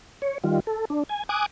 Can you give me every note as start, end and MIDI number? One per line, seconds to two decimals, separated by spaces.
0.22 0.38 73
0.44 0.60 51
0.44 0.60 55
0.44 0.60 65
0.67 0.85 69
0.90 1.03 62
1.09 1.23 80
1.29 1.46 80
1.29 1.46 86
1.29 1.46 87
1.29 1.46 90